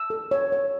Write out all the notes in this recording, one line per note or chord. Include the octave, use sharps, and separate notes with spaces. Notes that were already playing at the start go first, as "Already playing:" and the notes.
Already playing: E6
A4
C#5
C#5